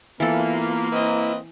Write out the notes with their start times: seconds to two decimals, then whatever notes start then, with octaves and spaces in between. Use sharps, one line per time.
0.20 E3 A#3 B3 F4 A4
0.92 C4 E4 B4 D#5